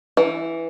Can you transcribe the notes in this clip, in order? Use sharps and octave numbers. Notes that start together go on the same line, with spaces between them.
E3